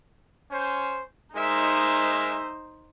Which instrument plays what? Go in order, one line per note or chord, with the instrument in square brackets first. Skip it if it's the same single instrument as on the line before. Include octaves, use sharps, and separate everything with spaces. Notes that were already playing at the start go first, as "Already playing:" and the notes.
[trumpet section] C#4 C5
[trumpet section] G#3 A#4 E5 [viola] D#4 C5